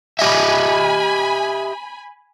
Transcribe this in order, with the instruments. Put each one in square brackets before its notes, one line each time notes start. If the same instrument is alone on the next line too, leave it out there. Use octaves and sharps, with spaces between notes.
[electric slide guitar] G4 D#5 E5 [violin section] G#5 B5